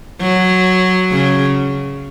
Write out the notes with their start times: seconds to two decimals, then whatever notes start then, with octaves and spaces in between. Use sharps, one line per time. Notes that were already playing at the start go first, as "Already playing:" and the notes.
0.21 F#3
1.12 C#3